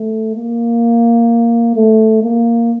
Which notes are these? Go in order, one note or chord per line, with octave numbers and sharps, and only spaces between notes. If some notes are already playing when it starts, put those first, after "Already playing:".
Already playing: A3
A#3
A3
A#3